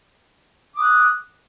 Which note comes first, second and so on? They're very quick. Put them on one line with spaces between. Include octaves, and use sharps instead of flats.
D6 D#6 F#6